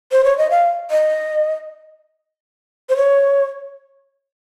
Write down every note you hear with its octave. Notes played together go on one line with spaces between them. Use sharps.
C5
C#5
D#5
F5
D#5
C5
C#5